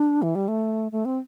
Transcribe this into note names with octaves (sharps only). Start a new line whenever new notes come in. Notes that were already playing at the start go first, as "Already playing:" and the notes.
Already playing: D4
E3
G3
A3
A3
C4